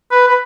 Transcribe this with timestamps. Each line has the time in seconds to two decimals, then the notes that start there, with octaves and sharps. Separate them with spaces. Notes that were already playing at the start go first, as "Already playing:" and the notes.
0.11 B4
0.28 B4